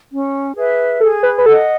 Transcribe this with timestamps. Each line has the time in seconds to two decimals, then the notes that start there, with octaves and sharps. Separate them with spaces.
0.09 C#4
0.55 G#4 B4 E5
1.00 G#4 A4
1.23 B4
1.38 B4
1.46 A4 D#5 F#5